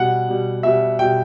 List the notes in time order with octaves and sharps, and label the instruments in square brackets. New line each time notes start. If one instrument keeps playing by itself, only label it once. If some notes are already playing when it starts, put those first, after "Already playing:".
Already playing: [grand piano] B2 G3 F#5
B2 G3
B2 G3 E5
B2 G3 G5